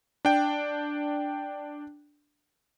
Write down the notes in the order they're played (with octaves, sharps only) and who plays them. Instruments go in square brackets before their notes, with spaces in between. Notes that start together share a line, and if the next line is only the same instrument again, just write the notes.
[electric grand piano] D4 G5